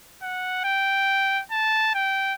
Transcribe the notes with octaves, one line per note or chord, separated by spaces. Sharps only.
F#5
G5
A5
G5